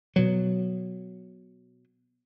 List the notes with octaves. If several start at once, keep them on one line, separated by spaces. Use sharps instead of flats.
B2 F#3